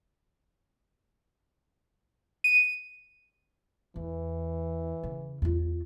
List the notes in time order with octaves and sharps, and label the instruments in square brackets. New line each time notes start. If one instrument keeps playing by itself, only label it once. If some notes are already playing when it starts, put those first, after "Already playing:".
[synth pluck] D#7
[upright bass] E2 [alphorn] E3
[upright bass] C#3
E2 F4